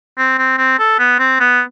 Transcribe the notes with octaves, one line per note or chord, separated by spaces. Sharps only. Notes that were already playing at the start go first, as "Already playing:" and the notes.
C4
C4
C4
A4
B3
C4
B3